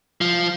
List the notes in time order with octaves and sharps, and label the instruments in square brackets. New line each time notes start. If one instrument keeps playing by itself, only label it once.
[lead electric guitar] F3